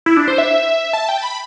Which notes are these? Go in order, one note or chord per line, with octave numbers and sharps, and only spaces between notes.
E4
D4
C5
E5
A5
G5
A5
B5